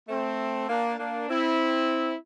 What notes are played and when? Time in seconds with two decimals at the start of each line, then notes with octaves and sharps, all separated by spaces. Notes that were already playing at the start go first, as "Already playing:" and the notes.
0.09 A3 C4
0.69 A#3 D4
0.99 A#3 D4
1.29 C4 E4